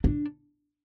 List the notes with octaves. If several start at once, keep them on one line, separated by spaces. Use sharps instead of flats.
D4